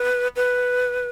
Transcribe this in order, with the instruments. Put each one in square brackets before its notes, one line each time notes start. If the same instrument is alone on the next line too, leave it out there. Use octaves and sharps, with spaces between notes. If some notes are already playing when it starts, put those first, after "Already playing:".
Already playing: [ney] B4
B4